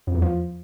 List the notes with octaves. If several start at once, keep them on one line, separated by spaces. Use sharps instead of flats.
F2
E2
F3